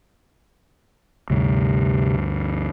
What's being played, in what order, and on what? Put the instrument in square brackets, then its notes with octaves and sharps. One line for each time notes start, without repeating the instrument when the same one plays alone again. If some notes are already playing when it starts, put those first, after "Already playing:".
[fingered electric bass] D2 G2 [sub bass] C3